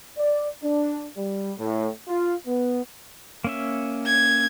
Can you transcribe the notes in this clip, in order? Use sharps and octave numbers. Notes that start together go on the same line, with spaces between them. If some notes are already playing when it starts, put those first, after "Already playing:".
D5
D4
G3
A2
F4
B3
A#3 C#4 E5
G#6